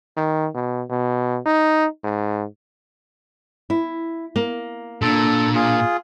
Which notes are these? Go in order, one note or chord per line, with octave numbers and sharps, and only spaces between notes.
D#3
B2
B2
D#4
G#2
E4
A#3
A#2 D4 A4
F4 G#4